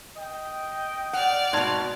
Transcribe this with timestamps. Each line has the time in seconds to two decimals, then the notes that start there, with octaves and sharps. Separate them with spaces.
0.17 D#5 G5
1.13 D5 F#5 F6
1.53 G#2 B2 A5 C6 G#6